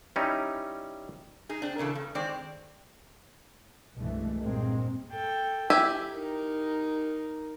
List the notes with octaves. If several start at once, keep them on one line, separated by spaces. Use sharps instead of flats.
G3 C#4 D#4 E4
D#4 G#4
C4 D4
A#2 C#3 E3 A4
G2
D#3 G#3 C4 D5
C2 G2 B2 E3 G#3 A3
G2 A#2 G#3 A#3 C4
A4 G5
E4 G4 E5 G#5
D#4 A#4